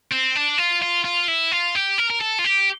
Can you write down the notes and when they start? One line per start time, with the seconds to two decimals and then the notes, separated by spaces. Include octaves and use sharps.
0.12 C4
0.35 D4
0.58 F4
0.82 F4
1.05 F4
1.28 E4
1.51 F4
1.75 G4
1.98 A#4
2.10 A#4
2.21 A4
2.39 F4
2.44 G4